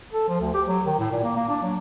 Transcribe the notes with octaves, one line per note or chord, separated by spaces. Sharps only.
A4
F3
D2
G4
F#3
D#3
A2
A#2
A#3
A#3
D4
F#3